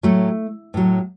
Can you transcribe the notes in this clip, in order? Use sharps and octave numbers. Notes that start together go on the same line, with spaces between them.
A2 F#3 A3
A2 F#3